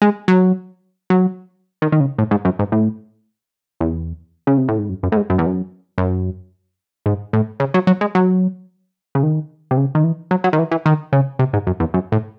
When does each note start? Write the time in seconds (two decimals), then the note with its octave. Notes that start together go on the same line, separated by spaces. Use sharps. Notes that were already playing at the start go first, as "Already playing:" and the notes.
0.02 G#3
0.28 F#3
1.10 F#3
1.82 D#3
1.92 D#3
2.00 C#3
2.18 A2
2.31 G#2
2.45 F#2
2.59 G#2
2.72 A2
3.80 E2
4.47 C#3
4.57 C3
4.68 A2
4.79 G#2
4.89 F#2
5.03 F#2
5.12 A2
5.17 G#2
5.30 F#2
5.38 E2
5.46 F#2
5.98 F#2
7.06 G#2
7.33 A2
7.60 C#3
7.74 F#3
7.87 F#3
8.01 G#3
8.15 F#3
9.15 C#3
9.23 D#3
9.71 C3
9.77 C#3
9.95 D#3
10.04 E3
10.31 F#3
10.44 F#3
10.53 D#3
10.59 E3
10.71 E3
10.86 D#3
11.13 C#3
11.39 C3
11.53 G#2
11.67 F#2
11.80 E2
11.94 F#2
12.12 A2